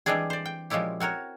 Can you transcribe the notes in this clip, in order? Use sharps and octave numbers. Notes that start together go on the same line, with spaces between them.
E3 G3 G#3 C4 D4 G#4
C5 D5
G5
A#2 F3 G#3 C#4 E4 G4
C4 F#4 A#4 C#5